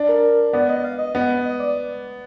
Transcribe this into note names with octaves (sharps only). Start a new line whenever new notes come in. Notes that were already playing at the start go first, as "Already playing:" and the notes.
Already playing: D4
A#4
B3 D5
D#5
F5
D#5
B3
D#5
D5